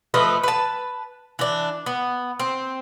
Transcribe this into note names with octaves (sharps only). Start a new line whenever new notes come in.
F3 A3 B4 D#5
B4 A5
E3 D4
B3
C4